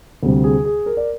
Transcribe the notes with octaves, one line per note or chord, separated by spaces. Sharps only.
D2 C3 G3
G#4
G#4
A#4
D5